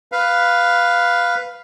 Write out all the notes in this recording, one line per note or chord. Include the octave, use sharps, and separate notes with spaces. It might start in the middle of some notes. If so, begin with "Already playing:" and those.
B4 F5